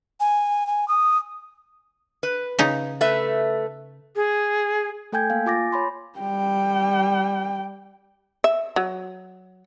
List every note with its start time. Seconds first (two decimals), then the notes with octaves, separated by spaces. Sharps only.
0.20 G#5
0.67 G#5
0.88 D#6
2.23 B4
2.59 C#3 D#4
3.01 A3 B4 E5
4.16 G#4
5.12 A3 A4 G5 G#5 G6 G#6
5.30 A#3 F5
5.46 F4 G#5 D6 A6 A#6
5.72 C#5 B5 C6
6.18 G3 G5
8.44 E5
8.76 F#3